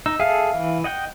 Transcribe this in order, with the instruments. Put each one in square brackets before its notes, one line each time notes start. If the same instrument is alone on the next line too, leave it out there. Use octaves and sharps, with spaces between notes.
[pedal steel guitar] D#4 [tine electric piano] E6
[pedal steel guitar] G#4 A4 [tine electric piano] E5 F5
[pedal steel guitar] E3
D#5 F#5 G5